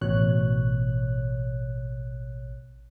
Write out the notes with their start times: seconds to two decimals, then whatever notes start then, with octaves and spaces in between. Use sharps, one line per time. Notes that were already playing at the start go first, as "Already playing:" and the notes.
0.01 A1 B2 C#5 F#6